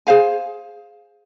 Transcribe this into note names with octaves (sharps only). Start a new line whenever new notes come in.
G#4 C5 F5 G#5